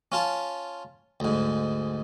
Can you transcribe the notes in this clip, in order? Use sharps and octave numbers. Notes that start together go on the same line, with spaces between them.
C#4 F4 A5
D2 G#2